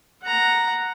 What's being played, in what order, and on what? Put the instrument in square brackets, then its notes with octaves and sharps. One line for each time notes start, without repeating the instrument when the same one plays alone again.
[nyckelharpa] F#5 A#5